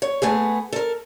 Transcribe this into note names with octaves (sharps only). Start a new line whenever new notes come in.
C#5
A3 B3 G#4
A4 A#4